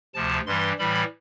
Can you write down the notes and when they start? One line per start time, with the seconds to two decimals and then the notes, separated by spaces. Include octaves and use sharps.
0.14 D2 C3 F3 A5
0.46 G2 E3 G3 C6
0.78 A2 E3 G3 B5